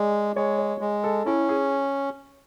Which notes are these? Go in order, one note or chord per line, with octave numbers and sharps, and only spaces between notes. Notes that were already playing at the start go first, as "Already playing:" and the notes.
Already playing: G#3 D5
G#3 C#5
C#5
G#3
A4
C#4 E4
G#4